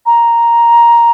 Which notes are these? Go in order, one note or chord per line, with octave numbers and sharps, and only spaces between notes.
A#5